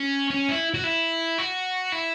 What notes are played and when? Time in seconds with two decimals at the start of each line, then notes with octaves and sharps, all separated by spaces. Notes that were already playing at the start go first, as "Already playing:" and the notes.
Already playing: C#4
0.30 C#4
0.49 E4
0.74 F#4
0.84 E4
1.38 F#4
1.92 E4